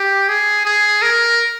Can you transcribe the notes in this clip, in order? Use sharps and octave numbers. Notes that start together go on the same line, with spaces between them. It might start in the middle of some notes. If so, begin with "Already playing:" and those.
Already playing: G4
G#4
G#4
A#4